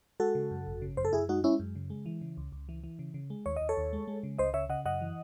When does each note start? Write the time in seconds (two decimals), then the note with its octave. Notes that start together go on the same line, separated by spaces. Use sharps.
0.20 G#3 F#4 A4
0.35 C#3
0.51 F#2
0.67 G#1
0.82 C#3
0.97 F#2 C5
1.05 A4
1.13 F#2 E4 G#4
1.29 G#3 D#4 F#4
1.44 G#3 C#4 E4
1.60 F#2
1.75 C#3
1.90 G#3
2.06 E3
2.21 C#3
2.37 C#2
2.52 C#2
2.69 E3
2.84 E3
2.99 C#3
3.14 C#3
3.30 G#3
3.46 D#2 C#5
3.56 D#2 D#5
3.69 A4 C#5
3.77 D#2
3.93 G#3
4.08 G#3
4.23 C#3
4.38 C#2 C5 D#5
4.54 C#3 C#5 E5
4.69 C#3 D#5 F#5
4.85 F#2 D#5 F#5
5.02 E3